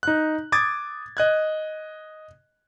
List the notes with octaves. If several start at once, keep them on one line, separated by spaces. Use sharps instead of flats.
D#4 F#6
D6 D#6 G#6 A6
D#5 F#6 G#6